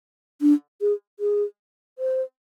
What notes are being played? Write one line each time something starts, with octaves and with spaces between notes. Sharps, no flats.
D4
G#4
G#4
C5